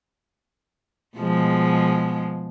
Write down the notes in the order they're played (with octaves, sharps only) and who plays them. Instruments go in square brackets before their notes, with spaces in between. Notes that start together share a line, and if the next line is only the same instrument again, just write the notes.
[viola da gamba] B2 F3 G#3